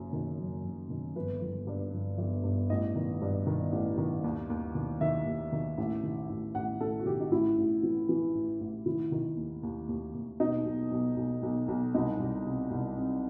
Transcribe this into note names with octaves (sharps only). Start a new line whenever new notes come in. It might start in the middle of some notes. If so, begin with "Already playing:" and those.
Already playing: F#1 F#2
D#3
F#1
F#1
D#3
G1 B4
G1
G2
G1
G1
G2
A1 D#5
D#3
G2
D#3
A1
D#3
D#2
D#2
D#3
D#3 E5
D#2
D#3
A1
D#3
A1
A1 F#5
A1 A4
F#4
D#3 G4
D#4
A1 E4
A1
E3
E3
A1
A1
D#3 E4
D#3
D#2
D#2
D#2
D#2
B2 D#4
B1
B1
B1
B1
B1
C2 D#4
C2
C3
C2
C3